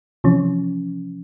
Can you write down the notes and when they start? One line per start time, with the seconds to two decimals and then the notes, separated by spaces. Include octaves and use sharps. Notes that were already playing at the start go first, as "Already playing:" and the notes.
0.24 C3 E3 F3 C#4